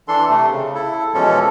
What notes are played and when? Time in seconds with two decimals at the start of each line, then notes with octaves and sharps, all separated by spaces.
0.08 E3 D4 A4 C6
0.29 C3 A3
0.51 C#3
0.75 E4 A4
1.14 B2 E3 F3 G#3 C#4 A4